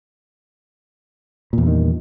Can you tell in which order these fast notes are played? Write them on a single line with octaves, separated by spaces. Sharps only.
A#2 E2 G2 D#3